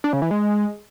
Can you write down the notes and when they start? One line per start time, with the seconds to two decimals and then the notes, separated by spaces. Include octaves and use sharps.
0.04 D4
0.13 C#3
0.22 E3
0.31 G#3